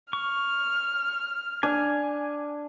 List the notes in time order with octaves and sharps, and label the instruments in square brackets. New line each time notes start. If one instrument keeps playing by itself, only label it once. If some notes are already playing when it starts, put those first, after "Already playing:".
[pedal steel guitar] C#6 [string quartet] F6
[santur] D4 [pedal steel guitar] G#5